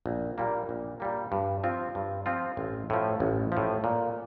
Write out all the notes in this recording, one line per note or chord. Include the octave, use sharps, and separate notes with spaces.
A#1
A#2 G3 A#3
A#1
A#2 G3 A#3
G2
F3 C4 F4
G2
F3 C4 F4
A1
A2 F3
A1
A2 F3
A#2